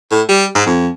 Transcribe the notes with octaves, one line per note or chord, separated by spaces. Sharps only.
A2
G3
G#2
F2